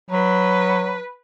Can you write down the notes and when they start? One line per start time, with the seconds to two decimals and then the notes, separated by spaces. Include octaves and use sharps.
0.11 F#3 B4